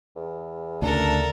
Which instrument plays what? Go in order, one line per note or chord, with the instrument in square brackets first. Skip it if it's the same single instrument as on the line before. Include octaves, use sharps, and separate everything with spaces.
[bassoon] E2
[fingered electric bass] D2 C#3 [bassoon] D4 [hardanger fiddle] A4 A#4